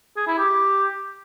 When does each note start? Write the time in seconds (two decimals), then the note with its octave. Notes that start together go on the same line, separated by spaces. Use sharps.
0.17 G#4
0.27 E4
0.38 G4